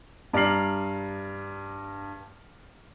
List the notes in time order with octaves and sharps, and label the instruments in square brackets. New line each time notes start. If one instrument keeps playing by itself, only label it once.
[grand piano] G2 D5 A#5 F6 C7 F#7